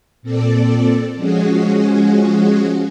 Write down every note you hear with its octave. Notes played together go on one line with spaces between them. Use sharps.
A#2 C4 A4 D5
F3 G#3 C#4 F#4 G#4